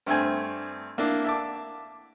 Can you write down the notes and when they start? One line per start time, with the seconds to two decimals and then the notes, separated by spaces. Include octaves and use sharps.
0.07 G2 A3 C4 G#5
0.98 A#3 D4 E4
1.25 E5 A5 D6